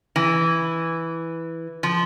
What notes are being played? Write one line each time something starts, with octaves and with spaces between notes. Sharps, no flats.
E3
F3